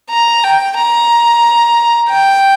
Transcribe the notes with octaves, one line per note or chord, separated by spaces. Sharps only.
A#5
G5
A#5
G5